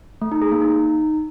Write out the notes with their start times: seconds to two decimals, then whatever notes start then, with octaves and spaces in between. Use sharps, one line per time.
0.22 A3
0.32 D#4
0.42 G#4
0.52 A#3
0.62 D#4